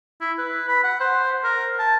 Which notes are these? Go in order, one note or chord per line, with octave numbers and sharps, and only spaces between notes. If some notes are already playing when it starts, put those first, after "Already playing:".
E4
B4
B5
F#5
C5
A#4
A5